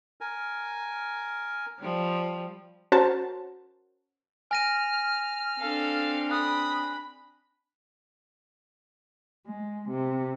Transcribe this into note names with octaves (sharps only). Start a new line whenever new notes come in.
A#4 G#5
F3 G3
C#4 F#4 A#4 C5 A5
G#5 F6 A#6 D#7
C4 D4 A4 F5
B5 D#6 F#6
G#3
C3